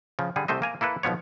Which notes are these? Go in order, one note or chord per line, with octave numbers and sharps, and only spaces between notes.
C#3 F3
D3 G3 G#4
C2 C3 A3 C5 D#5
A#3 G#5 A#5
A#3 E4 A4 B4
B1 B2 F3 B3 C#5